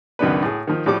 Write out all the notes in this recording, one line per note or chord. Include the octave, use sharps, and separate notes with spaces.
C#2 F#2 D#3 B3 D4 B4
A2 G#4
D#3 F3
A2 F3 G3 D6